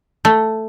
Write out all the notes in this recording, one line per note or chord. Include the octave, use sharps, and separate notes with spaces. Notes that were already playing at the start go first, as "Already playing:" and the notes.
A3